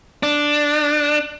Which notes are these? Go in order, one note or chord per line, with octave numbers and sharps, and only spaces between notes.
D4